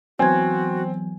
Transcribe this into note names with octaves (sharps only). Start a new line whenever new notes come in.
E3 F#3 B3 C4 F#4 G#5 G#6